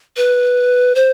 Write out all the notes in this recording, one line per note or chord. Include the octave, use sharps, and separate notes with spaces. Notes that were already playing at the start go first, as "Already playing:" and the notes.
B4
C5